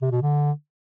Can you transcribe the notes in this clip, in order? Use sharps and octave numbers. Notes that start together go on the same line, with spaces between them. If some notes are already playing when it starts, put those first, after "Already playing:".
C3
B2
D3